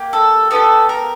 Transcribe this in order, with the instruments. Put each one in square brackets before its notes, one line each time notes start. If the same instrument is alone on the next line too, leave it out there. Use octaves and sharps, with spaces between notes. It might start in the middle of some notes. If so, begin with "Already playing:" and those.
Already playing: [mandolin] A#3 G4
A4
B3 D#4 G4 A4
A#4